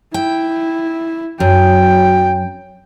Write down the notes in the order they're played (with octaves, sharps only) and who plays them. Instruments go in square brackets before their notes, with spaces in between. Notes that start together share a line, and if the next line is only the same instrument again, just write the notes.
[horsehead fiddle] E4 [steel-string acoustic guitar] G5
[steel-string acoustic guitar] F#2 [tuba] F#3 [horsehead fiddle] G5